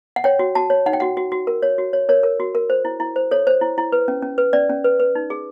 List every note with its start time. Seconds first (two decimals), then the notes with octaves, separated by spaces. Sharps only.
0.16 F#5
0.24 C#5 G5
0.39 F#4
0.55 F#4 A5
0.70 C#5
0.86 D#4 F#5
0.93 G5
1.00 F#4 F#5
1.17 F#4
1.32 F#4
1.47 A#4
1.63 C#5
1.78 F#4
1.93 C#5
2.09 A#4 C#5
2.23 A#4
2.40 F#4
2.55 A#4
2.70 C5
2.85 E4
3.00 E4
3.16 C5
3.31 A4 C#5
3.47 C5
3.61 E4
3.78 E4
3.92 B4
4.08 C#4
4.22 C#4
4.38 B4
4.53 C#4 D5
4.70 C#4
4.84 B4
5.00 B4
5.15 D#4
5.30 G#4